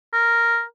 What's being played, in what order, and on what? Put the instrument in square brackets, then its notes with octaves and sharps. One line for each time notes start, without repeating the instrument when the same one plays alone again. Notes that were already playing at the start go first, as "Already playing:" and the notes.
[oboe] A#4